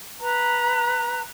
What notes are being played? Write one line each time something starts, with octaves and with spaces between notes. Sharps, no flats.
B4 A#5